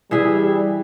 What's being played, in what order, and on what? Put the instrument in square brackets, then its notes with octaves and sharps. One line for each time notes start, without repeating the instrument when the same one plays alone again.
[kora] E3 G#4 E5 [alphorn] G3